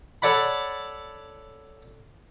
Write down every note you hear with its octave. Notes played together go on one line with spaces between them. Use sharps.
A4 C#5 D5 F#5 B5